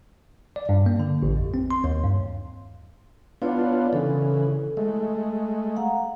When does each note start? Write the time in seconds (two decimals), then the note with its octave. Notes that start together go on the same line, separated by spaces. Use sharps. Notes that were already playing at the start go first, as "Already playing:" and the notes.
0.56 D5
0.69 G2
0.86 A#3
1.00 D3
1.23 A1
1.37 F2
1.54 C4
1.71 C6
1.84 D#2
2.03 G2
3.42 B3 D4 E4 F4 C#5 D5
3.93 C#3 E3 A4
4.77 G#3 A3
5.76 F5 F#5 A#5